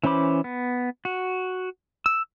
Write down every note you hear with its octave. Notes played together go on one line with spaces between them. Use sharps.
E3 C#4 C5 B5 D6
B3
F#4
E6